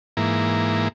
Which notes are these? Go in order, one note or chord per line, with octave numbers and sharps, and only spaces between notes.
G#2 E3 A#3